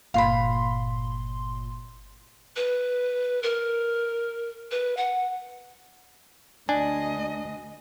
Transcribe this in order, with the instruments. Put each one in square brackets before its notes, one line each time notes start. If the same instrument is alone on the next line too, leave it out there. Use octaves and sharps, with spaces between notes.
[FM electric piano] G1 A#2 C6 [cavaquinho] F5 B5
[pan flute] B4
A#4
B4
F#5
[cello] D2 D#5 [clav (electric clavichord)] D4 [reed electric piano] G#5